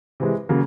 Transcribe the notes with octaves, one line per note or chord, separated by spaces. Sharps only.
C3 E3 G#3
C#3 F#3 A#3